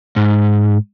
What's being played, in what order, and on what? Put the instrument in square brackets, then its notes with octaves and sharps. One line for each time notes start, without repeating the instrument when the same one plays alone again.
[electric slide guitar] G#2